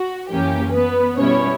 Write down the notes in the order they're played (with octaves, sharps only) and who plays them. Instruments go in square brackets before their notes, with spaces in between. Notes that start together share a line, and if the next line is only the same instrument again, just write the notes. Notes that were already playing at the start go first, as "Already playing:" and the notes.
Already playing: [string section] F#4
F#2 E3 A#3 C#4 G4
B3 B4
B2 G3 B3 C#4 E4 C#5